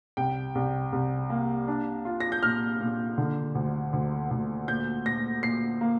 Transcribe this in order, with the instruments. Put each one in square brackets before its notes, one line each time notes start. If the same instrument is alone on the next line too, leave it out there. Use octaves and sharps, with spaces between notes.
[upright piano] C2 G5
C2
C2
A#3
D4
F4
A#6
G6
A#2 F6
A#2
D3
D2
D2
D2
A#2 G6
A#2 A#6
A#2 C7
A#3